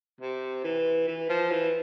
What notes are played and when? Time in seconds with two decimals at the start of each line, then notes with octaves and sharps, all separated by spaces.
0.21 C3
0.64 E3
1.07 E3
1.29 F3
1.51 E3